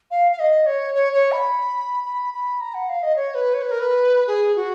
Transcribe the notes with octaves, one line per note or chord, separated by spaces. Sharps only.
F5
F5
D#5
C#5
C#5
C#5
B5
B5
B5
A#5
F#5
F5
D#5
C#5
B4
C#5
B4
A#4
B4
G#4
F#4